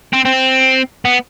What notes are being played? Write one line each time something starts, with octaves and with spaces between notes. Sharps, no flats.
C4
C4
B3